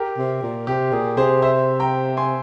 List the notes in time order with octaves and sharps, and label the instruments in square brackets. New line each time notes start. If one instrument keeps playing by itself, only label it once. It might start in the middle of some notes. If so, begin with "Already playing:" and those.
Already playing: [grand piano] G4 A#4
[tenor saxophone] C3
A#2
[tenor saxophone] C3 [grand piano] G4
[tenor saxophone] A#2 [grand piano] G#4
[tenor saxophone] C3 [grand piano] G#4 C5
[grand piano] C5 E5
G5 A#5
G#5 C6